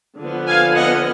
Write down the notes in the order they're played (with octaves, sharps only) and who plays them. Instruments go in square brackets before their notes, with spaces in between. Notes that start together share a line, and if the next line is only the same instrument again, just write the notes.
[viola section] D3 F3 B3
F5 G#5
D#5 F#5